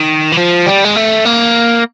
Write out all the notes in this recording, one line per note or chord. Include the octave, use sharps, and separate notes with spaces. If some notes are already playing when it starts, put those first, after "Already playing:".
Already playing: D#3
E3
F3
G3
G#3
A3
A#3